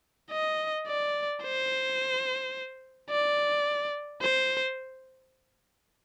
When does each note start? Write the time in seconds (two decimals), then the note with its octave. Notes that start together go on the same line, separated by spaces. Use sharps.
0.32 D#5
0.87 D5
1.43 C5
3.10 D5
4.22 C5